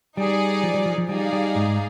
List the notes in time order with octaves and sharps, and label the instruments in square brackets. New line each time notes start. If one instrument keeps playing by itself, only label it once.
[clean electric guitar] G3 [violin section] D#4 G#4 D5
[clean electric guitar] F3
G3
F3
F3
[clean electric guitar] G3 [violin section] D#4 G#4 D5 F5
[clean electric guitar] G3
G#2